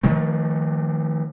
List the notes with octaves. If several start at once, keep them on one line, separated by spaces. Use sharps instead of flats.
D#3 F3 A3